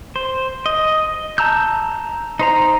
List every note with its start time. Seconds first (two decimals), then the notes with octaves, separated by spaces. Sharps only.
0.16 C5
0.66 D#5
1.38 A5 A#5 E6 G6
2.39 D#4 C5 A#5